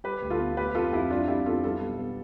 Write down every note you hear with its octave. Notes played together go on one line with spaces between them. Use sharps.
G3 G4 B4
D2
F4 A4
B3
A3 G4 B4
F2 F4 A4
F2 E4 G4
G3 D4 F4
F2 E4 G4
B3 F4 A4
G3 F4 A4
B1
B3